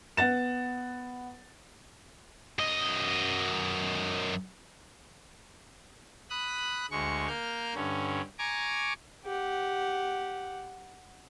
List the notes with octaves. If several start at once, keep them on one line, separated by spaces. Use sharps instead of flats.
B3 F#5 A6 E7
F#2 D#5
B5 D#6 F#6
D2 G#3 C#6
A#3 F6 G6
G2 D3 C#4
G#5 A#5 C#6 D6
G4 F#5